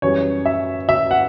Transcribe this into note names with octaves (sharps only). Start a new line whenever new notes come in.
F#2 E3 G3 C#5
E5
E5
F#5